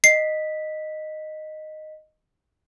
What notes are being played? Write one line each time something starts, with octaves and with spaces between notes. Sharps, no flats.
D#5 B6 C7